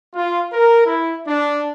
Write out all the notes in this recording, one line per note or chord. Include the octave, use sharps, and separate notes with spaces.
F4
A#4
E4
D4